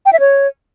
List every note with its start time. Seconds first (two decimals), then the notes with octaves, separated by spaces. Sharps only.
0.06 G5
0.13 E5
0.20 C#5